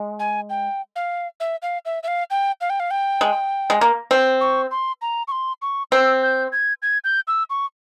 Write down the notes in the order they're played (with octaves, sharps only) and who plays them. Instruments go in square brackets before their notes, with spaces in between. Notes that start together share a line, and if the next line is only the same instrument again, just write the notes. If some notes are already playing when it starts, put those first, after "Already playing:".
Already playing: [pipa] G#3
[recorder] G#5
G5
F5
E5
F5
E5
E5
F5
G5
F5
G5
F5
G5
[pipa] G#3
G#3
A#3
C4
[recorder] C#6
C6
A#5
C#6
C6
C#6
[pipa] C4 [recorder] E6
[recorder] G6
G#6
G#6
G6
E6
C#6